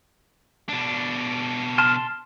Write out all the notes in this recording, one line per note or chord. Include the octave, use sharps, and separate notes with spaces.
B2 D4
A5 C6 F6